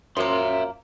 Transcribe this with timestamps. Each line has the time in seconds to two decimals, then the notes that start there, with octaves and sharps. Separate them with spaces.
0.17 F#2 F3 A#3 E5 C6